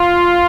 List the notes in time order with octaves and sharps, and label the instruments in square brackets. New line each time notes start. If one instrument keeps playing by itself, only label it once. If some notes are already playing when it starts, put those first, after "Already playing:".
Already playing: [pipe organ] F4